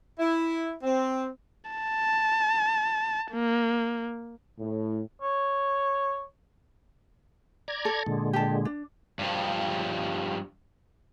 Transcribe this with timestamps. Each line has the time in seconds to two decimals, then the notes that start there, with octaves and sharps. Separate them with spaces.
0.19 E4
0.83 C4
1.71 A5
3.32 A#3
4.59 A2
5.22 C#5
7.68 D5 A#5 G#6
7.85 A4
8.06 A#2 D3 G#3
8.33 G4 A5
8.65 D4
9.19 G2 F3